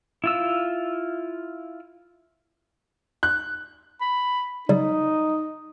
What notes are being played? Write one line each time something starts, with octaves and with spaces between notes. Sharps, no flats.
E4 F4 E6
F#6
B5
C#3 F#3 G3 D#4